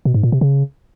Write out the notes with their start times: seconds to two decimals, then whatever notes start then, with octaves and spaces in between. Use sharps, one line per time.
0.05 B2
0.14 G#2
0.23 A#2
0.32 C3
0.41 C#3